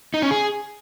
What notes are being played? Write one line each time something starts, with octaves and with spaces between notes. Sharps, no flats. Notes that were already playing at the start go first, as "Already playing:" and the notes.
D#4
C#4
G#4